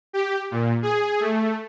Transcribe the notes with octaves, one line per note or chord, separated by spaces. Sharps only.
G4
A#2
G#4
A3